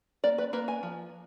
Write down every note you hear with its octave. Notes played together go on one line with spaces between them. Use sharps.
A#3 D5
B4
A#3 B4
G#5
F3